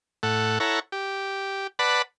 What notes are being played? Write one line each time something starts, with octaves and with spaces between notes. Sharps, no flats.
A2 A4 F#5
E4 A4 C#5 F#5 A#5
G4
B4 D5 F#5 A5 B5